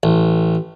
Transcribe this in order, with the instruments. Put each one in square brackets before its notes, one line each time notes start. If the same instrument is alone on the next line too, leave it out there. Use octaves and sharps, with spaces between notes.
[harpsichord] A1